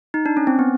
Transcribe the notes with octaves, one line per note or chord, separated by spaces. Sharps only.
D#4
D4
C#4
C4
B3